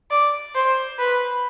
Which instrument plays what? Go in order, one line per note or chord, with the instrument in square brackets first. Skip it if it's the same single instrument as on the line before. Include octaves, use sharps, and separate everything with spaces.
[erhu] D5
C5
B4